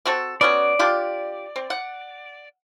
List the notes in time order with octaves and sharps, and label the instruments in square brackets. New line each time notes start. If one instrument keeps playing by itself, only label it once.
[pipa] C4 F#4 A4
[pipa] B3 C#4 F#4 [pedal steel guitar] D5
[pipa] D4 F4 G4
C4
F#5